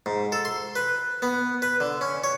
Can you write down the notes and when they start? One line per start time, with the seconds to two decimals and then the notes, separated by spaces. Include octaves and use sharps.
0.06 G#2
0.32 A4
0.45 C6
0.76 B4
1.22 B3
1.62 B4
1.80 D3
2.01 C#4
2.24 C#5